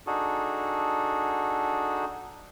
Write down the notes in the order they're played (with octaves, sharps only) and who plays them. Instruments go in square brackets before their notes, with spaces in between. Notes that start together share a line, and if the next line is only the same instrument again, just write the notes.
[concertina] D4 D#4 F#4 G#4 A4